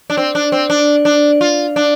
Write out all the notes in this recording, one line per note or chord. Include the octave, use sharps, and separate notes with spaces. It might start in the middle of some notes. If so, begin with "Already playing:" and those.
D4
C4
D4
C4
D4
D4
F4
D4